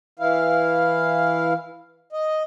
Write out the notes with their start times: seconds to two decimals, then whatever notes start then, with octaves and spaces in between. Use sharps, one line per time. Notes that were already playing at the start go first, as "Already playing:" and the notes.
0.19 E3 E4 F5
2.13 D#5